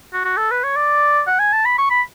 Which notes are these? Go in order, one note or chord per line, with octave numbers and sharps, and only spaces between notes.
F#4
F#4
A4
B4
C#5
D5
F#5
G#5
A5
B5
C#6
B5